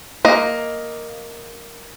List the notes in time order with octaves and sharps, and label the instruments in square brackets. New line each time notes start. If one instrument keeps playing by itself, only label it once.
[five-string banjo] A#3 D#5